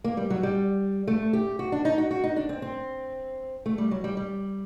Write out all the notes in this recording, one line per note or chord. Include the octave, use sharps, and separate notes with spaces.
A#3
G3
F#3
G3
A3
G4
F#4
D4
D#4
F#4
F#4
D#4
D4
C4
C4
A3
G3
F#3
G3
G3